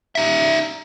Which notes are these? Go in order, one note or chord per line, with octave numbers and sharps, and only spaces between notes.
D#4 E5